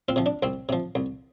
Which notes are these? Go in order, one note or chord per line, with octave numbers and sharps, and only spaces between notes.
C4 F4
C3 F3
D4
C2 C4
C3 F3
C2